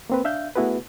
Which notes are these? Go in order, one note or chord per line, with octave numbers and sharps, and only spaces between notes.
A#3 C4 B4
D4 E5 F5 G6
A3 B3 E4 F#4 G#4 B4